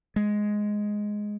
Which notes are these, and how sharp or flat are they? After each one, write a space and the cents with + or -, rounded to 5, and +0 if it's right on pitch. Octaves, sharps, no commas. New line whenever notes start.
G#3 +5